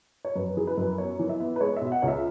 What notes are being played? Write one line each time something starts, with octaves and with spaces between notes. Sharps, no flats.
C#5
F#2 B4
E3 G#4
B4
F#2
B3 C#5
E3
E5
B3
B4
G#3 C#5
B2 E5
F#5
C#2 C#5
E5